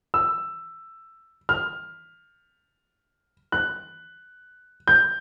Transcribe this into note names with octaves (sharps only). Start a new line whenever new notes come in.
E6
F6
F#6
G6